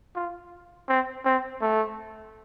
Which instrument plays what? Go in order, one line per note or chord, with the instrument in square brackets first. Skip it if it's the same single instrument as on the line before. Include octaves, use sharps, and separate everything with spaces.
[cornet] F4
C4
C4
A3